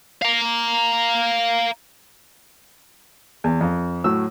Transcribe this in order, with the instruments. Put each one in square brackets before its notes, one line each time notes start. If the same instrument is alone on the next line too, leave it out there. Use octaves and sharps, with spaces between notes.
[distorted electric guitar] F5 A#5
[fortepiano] E2
F2
A2 F#3 E6